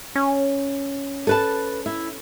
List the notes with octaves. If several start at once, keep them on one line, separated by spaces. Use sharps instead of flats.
C#4
A4 B4 A5
E4